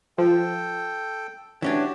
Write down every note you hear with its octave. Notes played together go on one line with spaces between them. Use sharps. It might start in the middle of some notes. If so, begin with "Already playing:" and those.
F3 A4 G5
E3 C#4 D4 F#4 G4